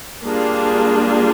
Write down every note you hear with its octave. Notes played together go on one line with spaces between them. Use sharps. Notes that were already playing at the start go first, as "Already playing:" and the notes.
G3 A#3 D4 F4 G#4